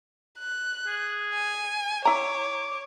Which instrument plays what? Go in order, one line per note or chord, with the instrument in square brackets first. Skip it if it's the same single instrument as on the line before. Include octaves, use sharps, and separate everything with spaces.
[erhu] F#6
[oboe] G#4
[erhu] G#5
[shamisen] E4 A#5 [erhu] C#5 [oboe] D6